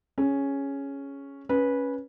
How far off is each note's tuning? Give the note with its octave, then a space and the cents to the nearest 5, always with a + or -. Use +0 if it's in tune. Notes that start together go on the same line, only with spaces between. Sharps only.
C#4 +0 G#4 +0
C#4 +0 B4 -15